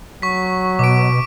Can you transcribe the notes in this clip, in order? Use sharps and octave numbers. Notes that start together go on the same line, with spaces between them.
F#3 C#6 B6
B2 D6 D7